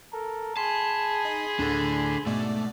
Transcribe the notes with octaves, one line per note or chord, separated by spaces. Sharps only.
A4 A#4
G#4 G#5 A5 B5 C6
D#4
D2 A2 D4 A4
G#2 B2 A3 D5